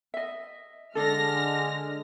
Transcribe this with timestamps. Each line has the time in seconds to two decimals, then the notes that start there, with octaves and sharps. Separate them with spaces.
0.14 D#5 E5
0.95 D3 G#3 D4 A4 F6 A#6